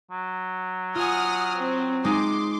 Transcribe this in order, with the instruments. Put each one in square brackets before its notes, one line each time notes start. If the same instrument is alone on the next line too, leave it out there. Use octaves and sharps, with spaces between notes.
[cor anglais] F#3
[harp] F4 G#5 [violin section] F#5 D#6 F6
[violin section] C4
[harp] G#3 D#4 G#4 [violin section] C6 D6